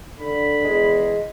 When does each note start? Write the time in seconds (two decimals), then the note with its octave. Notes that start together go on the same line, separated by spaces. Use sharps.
0.20 D3 B5
0.65 E2 G#3